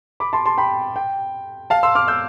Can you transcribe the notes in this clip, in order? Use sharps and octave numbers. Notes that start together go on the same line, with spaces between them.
B5 D6
A5 C6
A5 C6
G5 B5
G5
F5 A5
C6 E6
D6 F6
E6 G6